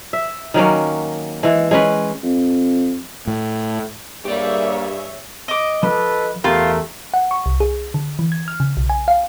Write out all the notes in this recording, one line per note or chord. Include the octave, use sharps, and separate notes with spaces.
E5
D#3 F#3 A#3 C#4
E3 G#3
G#3 C#4 B4
F2
A2
G2 A#3 G4 G#4 C#5 D5 E5
D#5 D6
F3 A4 B4
E2 A3 F4 G4 A#4 B5
F#5
C#6
C2
G#4
D3
E3
G#6
F6
C#3
B1
G#5
F5